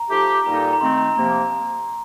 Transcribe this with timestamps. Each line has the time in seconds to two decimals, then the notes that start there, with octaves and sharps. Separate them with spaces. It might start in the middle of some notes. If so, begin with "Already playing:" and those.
Already playing: A#5
0.09 F3 A3 D#4 G4
0.46 A#2 G3 A#3 D#4 A4 A#5
0.73 A#5
0.81 D#3 A3 C4 C6
0.98 A#5
1.16 C3 F3 A#3 A#5